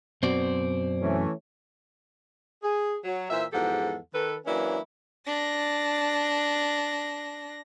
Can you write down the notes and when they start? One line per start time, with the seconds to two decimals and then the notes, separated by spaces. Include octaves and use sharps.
0.23 F#2 B2 C4 C5 D5
1.01 E3 A3 C#4
2.63 G#4
3.04 F#3
3.30 A#2 E3 C5 E5
3.52 E2 G#2 F3 G4 A4 F#5
4.14 D#3 A4 B4
4.46 E3 F#3 A#3 C#4 D4 E4
5.27 D4 A#6